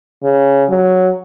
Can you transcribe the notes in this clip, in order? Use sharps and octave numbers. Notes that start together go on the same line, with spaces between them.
C#3
F#3